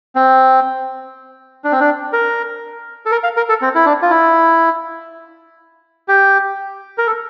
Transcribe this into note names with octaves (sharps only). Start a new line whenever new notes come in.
C4
D4
C4
D4
A#4
A4
A#4
F5
A#4
A4
C4
E4
D4
F4
E4
G4
A#4
A4